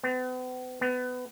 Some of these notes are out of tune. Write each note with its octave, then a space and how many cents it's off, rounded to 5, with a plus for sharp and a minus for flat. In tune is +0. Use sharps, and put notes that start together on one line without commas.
B3 +45
B3 +25